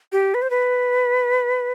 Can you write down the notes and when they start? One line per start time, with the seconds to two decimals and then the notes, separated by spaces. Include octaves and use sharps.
0.12 G4
0.34 B4
0.42 C5
0.50 B4